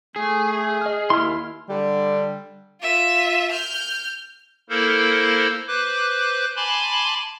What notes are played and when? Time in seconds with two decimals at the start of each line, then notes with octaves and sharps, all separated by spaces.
0.16 A3 G#4
0.81 D#5 F6
1.10 D#2 E4 C6 F6
1.68 D3 G3
2.82 F4 E5
3.51 F6 G6
4.69 A#3 E4 A4 A#4 C5
5.68 B4 C5 D6 F#6
6.56 G#5 A5 B5 C6 D6